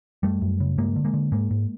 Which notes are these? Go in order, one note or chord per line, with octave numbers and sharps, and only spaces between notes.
F#2 G3 A3
F#2
C#3
G2 G#3 A#3
D3
G#3 A#3
D3
G#2 G#3 A#3
G#2